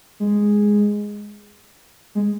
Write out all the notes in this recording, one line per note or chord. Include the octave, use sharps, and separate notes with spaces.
G#3
G#3